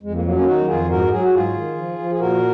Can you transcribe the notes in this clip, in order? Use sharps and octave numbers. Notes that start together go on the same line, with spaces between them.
F2 G#3
A#3
F#3 A#3
A#3 C#4
D#3 D#4 F#4
F2 F4 G#4
G#2 F#4 A#4
F#3 G#4
F#4
G#2 F4 G#4
D#3
F3
F3
G#4
A#2 F#4 A#4